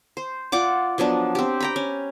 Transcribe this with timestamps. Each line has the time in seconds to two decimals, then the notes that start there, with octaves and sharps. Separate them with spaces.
0.17 C5
0.52 F4 D5 F#5 D6
0.98 F3 F#3 B3 D4
1.35 C4 G4
1.60 G5 A#5 B5
1.76 C#4